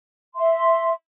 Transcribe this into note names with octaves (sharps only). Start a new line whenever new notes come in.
E5 C6